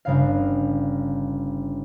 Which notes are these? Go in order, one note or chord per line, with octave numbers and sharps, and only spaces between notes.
G1 C#3 F5